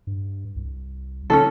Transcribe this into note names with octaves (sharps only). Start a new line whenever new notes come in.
G2
C2
C#3 C#4 D4 A4